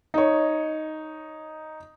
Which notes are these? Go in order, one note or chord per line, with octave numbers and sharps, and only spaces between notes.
D#4 C#5